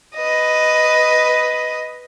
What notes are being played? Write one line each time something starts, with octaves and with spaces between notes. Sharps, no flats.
B4 D#5